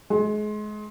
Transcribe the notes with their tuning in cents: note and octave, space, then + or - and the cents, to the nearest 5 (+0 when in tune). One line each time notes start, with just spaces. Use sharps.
G#3 +30